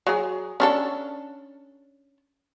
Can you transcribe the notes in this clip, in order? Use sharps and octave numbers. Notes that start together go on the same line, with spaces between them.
F#3 G#4
C#4 D4 A4